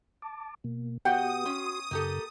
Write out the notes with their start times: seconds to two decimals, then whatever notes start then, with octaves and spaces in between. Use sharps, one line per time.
0.22 A5 D6
0.64 B2 A#3
1.05 B2 B3 F#4 G4 F#5 G5 D#6
1.46 C#4 F#4 C6
1.91 F#2 C#3 A#3 G4 A4